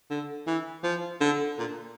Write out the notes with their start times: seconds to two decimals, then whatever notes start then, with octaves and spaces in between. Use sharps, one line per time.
0.10 D3
0.47 E3
0.84 F3
1.20 D3
1.58 A#2